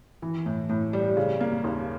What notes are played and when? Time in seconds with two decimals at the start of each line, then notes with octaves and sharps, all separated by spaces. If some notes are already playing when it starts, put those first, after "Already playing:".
0.22 E3
0.46 A2
0.69 A2
0.93 G3
1.17 C#3
1.41 A#3
1.64 D#2